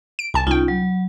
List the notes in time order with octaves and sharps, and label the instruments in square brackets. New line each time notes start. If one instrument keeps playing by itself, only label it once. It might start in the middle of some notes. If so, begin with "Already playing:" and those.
[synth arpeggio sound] D7
[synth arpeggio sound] C2 A5 [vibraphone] G#5
[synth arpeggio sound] C2 G5 [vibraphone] C#4 D#4 F4
[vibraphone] F#3